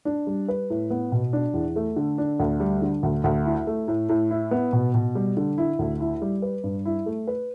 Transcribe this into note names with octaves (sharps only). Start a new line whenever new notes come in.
D4
G3
B4
A2
B3
B2
D4
E2
A3
D3
D4
D2
G3
D3
D2
D2
E4
A3
A2
A2
E4
B3
B2
B2
G3
D3
E4
D2
E4
G3
B4
G2
E4
A3
B4